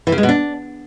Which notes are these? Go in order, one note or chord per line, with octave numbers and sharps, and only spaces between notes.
E3
C#3
G#3
B2
D4